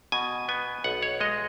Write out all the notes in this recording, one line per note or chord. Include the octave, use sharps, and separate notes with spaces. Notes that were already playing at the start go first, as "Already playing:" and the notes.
B2 G#5
B3 G#5
B1 F#5
C#5
G#3 D#5